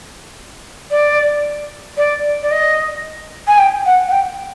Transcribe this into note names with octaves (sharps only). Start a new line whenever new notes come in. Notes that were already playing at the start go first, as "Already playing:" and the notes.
D5
D5
D5
D#5
G#5
G5
F#5
F#5
G5